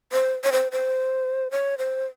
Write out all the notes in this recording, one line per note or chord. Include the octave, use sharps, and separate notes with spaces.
C5
C#5
C5
C5
C#5
C5